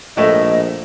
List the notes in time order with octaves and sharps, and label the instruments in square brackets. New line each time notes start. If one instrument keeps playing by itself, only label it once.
[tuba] A#1 [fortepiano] A2 A3 [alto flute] D#5